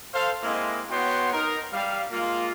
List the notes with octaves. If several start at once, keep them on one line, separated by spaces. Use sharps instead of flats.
A4 C5 F5
G#3 A#3 C4 E4 D#5
B3 F#4 C#5 G5 C6
D#4 A#4
G3 F5
G#3 A#3 F4